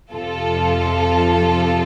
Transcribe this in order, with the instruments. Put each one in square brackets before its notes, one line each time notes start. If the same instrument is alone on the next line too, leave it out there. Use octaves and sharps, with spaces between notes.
[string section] F2 C3 F3 F4 A4